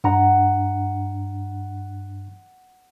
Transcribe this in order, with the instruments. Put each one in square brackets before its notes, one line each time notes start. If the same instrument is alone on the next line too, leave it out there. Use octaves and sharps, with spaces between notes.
[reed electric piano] G2 D4 A#5 [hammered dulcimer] F#5